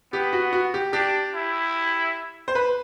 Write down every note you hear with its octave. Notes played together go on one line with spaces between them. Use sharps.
B3 G4
F#4
F#4
G4
D4 G4
E4
C5
B4